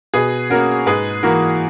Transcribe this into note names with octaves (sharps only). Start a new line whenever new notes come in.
B2 G#4 B4
A#3 C#4 F#4 A#4
G#2 G#4 B4
E3 A#3 F#4 A#4